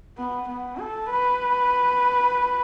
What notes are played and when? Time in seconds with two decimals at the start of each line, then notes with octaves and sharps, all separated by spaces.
0.18 B3
0.48 B3
0.80 A4
1.10 B4